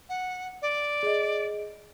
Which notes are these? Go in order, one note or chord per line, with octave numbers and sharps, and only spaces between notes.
F#5
D5
G#4 D#5